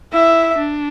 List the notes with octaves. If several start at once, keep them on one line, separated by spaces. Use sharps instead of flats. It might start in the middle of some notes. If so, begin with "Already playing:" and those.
E4 E5
D4